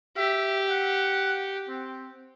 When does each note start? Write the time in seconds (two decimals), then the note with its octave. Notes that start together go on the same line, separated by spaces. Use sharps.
0.17 G4 E5
0.70 F#5
1.68 C4